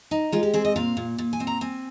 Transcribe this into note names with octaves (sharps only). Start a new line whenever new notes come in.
D#4
G#3 F4
G4
C4 G#4
D#5
A#2 F5
A#2
A#2
G#5
C4
A#5
C4 G#5